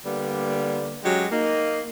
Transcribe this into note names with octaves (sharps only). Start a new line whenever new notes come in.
D3 G3 A#3 B3
F#3 G#3 C#4 G4
A#3 D#4